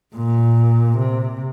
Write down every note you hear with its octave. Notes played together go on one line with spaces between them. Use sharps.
A#2
C3